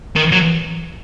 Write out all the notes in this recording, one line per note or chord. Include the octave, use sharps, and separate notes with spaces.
D#3
F#3